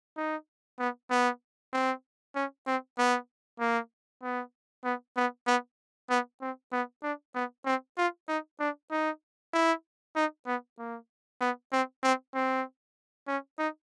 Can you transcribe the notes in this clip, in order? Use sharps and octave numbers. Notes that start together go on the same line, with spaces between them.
D#4
B3
B3
C4
C#4
C4
B3
A#3
B3
B3
B3
B3
B3
C4
B3
D4
B3
C4
F4
D#4
D4
D#4
E4
D#4
B3
A#3
B3
C4
C4
C4
C#4
D#4